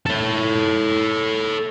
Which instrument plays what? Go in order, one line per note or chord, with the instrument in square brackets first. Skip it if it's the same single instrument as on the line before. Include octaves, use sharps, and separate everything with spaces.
[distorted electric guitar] A4 C#5